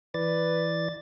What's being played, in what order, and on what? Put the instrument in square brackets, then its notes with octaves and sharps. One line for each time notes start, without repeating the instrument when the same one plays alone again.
[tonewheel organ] E3 D5 A6 [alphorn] B4